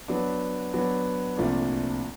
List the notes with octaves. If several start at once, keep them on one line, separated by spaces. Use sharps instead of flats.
F#3 B3 D4
F#3 B3 D4
C2 A#2 F3 A3 D4